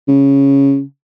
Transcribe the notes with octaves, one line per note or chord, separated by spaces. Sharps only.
C#3